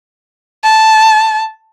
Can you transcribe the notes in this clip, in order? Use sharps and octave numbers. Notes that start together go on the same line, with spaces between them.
A5